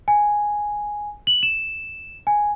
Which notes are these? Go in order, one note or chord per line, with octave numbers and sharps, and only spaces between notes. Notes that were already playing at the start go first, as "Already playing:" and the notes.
G#5
F#7
E7
G#5